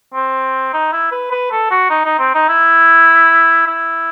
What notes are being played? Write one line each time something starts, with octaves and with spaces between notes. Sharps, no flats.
C4
D#4
E4
B4
B4
A4
F#4
D#4
D#4
C4
D#4
E4
E4